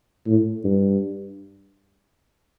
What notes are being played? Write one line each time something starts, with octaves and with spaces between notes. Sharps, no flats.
A2
G2